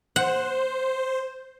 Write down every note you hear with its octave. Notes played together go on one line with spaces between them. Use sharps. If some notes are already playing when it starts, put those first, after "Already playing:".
C5 F#5